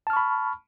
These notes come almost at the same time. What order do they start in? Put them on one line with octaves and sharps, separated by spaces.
A5 F6 C#6 B5